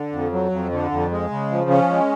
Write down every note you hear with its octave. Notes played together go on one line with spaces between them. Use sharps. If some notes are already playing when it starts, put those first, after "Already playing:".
Already playing: D3
F2
F#3
F2
D3
F2
G#3
C#3
F3
C#4
G#3